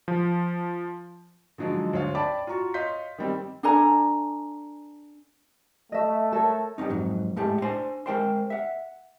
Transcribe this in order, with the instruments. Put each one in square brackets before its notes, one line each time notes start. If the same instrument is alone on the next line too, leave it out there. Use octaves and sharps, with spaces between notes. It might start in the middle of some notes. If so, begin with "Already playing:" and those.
[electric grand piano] F3
[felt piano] D3 F3 F#3 G#3 D#4
D2 C5 C#5 F5
D5 G5 A5 B5 D6
F4 F#4 A#5 C#6
C#5 D#5 F5 C6 G6 B6
D#3 G3 C4
[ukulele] D4 A4 G#5 A#5
[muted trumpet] A3 [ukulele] D#5 E5
[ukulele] A4 A#4 C#5
[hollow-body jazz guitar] G3 B3 C#4 D#4
F2 G#2 F#3
A2 G#3 A3 G4 A4
D4 C5 G#5 C6
G#3 A#4 C5 G5 A5 C6
E5 F#5